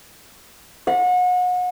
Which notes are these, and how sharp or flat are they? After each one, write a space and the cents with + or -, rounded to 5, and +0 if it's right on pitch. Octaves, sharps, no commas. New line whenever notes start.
F#5 -35